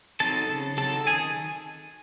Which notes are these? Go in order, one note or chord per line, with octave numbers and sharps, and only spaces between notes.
F#3 C4 D#4 A4 A5
C#3
F#3 C4 D#4 A4 A5
D#3 G#4 G#5